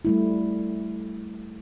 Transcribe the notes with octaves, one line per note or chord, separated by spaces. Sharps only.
G3 A3 E4